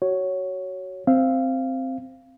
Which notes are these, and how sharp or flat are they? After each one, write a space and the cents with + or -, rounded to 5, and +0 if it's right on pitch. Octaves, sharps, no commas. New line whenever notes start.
F#4 +20 C#5 +0
C4 +0 F5 -15